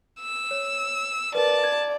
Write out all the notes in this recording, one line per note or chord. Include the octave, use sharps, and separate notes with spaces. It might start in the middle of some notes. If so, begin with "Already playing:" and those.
E6
C#5
A#4 B4 D5 A5
G#6